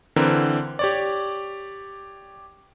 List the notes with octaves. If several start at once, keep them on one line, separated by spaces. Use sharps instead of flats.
D3 E3 C4 A#4
G4 C#5 D5